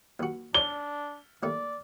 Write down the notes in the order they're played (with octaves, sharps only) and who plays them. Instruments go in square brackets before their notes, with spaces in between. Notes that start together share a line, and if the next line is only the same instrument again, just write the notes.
[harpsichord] D#2 F#4
[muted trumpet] D4 [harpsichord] C#5 D5 A#5 [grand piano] G7
[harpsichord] D#2 A3 [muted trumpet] D5